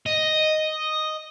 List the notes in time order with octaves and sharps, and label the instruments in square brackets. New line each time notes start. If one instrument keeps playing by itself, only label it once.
[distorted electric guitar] D#5